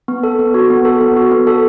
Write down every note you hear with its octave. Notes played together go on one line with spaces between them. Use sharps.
B3
A4
B3
F#4
B3
A4
B3
F#4
B3
A4